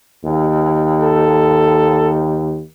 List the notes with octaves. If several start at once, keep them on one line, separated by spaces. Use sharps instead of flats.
D#2
A4